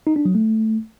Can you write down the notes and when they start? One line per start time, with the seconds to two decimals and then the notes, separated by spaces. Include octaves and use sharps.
0.07 D#4
0.16 D4
0.25 F#3
0.35 A3